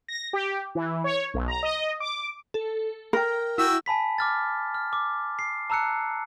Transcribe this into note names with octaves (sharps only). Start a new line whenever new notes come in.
A#6
G4
E3
C#5
B1
A#5
D#5
D6
A4
A#4 G5 A#5
E4 F#4 G5 E6
G#5 A5 B5 B6
D6 F6 A6
F6
D6
C7
A5 A#5 E6 F#6 C#7